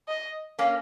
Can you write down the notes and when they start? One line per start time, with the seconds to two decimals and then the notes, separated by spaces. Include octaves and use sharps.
0.08 D#5
0.59 A#3 C#4